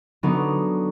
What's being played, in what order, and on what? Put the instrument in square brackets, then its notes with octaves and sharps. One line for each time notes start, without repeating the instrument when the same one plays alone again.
[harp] D3 F#3 B3 D#4